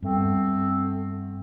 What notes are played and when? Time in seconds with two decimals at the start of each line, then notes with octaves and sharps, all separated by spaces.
0.02 G2 A3 B3 C4